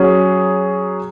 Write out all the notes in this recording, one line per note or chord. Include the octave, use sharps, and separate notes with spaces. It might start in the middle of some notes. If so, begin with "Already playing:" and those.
Already playing: F#3 C#4 G#4